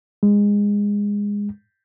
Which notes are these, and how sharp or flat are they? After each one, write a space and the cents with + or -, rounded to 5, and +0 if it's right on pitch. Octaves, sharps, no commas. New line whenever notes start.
G#3 -20